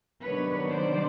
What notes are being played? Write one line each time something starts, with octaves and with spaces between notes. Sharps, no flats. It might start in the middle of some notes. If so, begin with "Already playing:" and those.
C3 D#3 F#3 B3 D4 B4 C#5
C5 D5